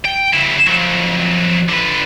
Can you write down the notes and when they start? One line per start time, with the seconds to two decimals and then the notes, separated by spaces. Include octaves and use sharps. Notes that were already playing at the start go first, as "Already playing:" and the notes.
0.05 G5
0.34 C#3 E4
0.68 F2 F#3
1.69 D3 B4